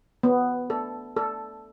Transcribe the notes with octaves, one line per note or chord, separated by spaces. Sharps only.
B3
A4
A4